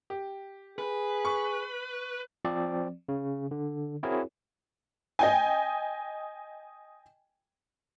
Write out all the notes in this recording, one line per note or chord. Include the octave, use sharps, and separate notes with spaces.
G4
G#4 B4
C#6
F3 C4 D5
C#3
D3
C4 E4 F#4 G#4 A#4 C#5
D#5 G5 G#5